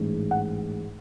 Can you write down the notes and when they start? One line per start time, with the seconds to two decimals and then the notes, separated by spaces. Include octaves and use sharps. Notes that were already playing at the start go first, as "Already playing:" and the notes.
Already playing: A1 G#2 G#3
0.31 F#5